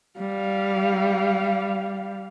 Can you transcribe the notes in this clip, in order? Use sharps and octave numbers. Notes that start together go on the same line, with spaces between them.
G3 F5